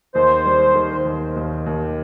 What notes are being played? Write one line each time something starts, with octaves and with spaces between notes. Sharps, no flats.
D#2 C5
G3
D#3
D#2
D#2
D#2